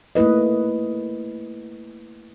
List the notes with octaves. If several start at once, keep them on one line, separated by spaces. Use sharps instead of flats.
A3 A#3 E4 B4 D#5